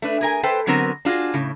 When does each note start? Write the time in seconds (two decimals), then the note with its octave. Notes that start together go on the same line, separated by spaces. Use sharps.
0.02 A3 D4 B4
0.21 G#4 A#4 G#5
0.43 A4 B4 C5 G5 A5
0.67 D3 F#3 B3 C4 A#4
1.05 D4 F4 F#4 G#4
1.34 A2 C#3